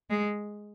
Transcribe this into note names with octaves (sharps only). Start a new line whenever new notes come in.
G#3